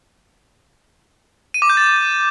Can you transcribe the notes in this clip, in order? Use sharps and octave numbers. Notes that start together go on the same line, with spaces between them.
D#7
D6
G6
A6